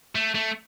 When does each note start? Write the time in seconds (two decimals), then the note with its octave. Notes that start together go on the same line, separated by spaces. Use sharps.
0.15 A3
0.35 A3